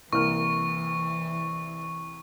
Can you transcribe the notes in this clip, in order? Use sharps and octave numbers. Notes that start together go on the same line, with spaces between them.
C2 E3 A#3 C#6 F6